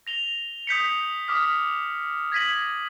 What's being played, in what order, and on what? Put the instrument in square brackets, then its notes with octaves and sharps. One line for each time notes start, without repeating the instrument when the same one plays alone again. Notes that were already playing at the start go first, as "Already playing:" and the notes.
[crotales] A#6 F7 G7
D#6 G6 B6 C#7
D6 D#6 F6 B6
G#6 A#6 B6 D#7 F#7